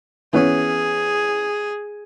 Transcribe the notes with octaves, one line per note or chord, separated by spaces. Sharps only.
E3 B3 C#4 G#4